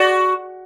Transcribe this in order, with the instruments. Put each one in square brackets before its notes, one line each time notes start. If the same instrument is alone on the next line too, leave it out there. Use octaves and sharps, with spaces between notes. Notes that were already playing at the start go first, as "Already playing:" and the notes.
Already playing: [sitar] F#4 [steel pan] D5